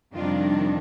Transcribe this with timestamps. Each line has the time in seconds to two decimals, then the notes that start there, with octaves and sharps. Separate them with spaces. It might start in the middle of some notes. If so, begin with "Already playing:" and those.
0.14 F2 C3 D#3 G3 D4 F4